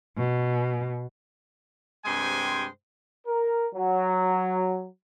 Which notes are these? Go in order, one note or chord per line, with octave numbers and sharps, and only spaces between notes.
B2
G2 C3 G#3 C5 G5 G#5
A#4
F#3